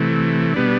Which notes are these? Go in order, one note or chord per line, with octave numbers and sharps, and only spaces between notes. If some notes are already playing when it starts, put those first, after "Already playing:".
Already playing: C3 E3 A3
B2 G3 B3 D4